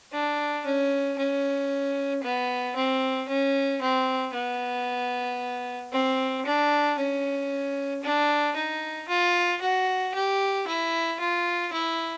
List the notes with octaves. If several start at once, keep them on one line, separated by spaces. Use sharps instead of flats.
D4
C#4
C#4
B3
C4
C#4
C4
B3
C4
D4
C#4
D4
D#4
F4
F#4
G4
E4
F4
E4